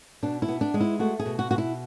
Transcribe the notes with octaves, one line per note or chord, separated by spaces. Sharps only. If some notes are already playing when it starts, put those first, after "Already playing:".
B2 D4
E4
B3
D4
G#3
E4
A3 F#4
G#4
B2
F#4
B2 F#4
E4